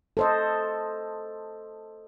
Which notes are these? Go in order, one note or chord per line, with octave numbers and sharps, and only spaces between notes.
A4 C5 D#5